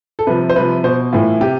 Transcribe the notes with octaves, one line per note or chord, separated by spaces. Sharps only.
A4
C3 F3 B4
C5
C3 F3 B4
B2 C5
A2 E3 F4
C3 G4